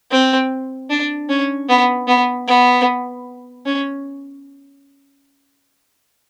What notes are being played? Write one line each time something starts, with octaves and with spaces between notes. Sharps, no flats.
C4
D4
C#4
B3
B3
B3
C#4